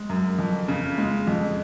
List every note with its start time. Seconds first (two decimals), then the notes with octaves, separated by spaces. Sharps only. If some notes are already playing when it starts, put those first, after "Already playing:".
Already playing: G#3
0.09 F#2
0.39 F2
0.68 C#3
0.98 G#3
1.27 F2